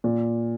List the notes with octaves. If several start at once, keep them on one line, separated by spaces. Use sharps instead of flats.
A#2